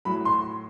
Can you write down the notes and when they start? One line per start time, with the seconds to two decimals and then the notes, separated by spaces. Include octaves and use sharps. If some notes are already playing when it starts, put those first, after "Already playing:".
0.05 A2 F#3 B5
0.25 C6